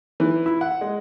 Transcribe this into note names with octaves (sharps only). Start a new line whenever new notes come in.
E3
E4
F#5
G#3